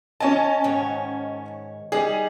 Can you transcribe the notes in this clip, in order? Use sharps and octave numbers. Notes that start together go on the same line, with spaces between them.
C#4 C#5 D#5 G#5 A5
G#2 D#3 C#5
G3 D#4 G#4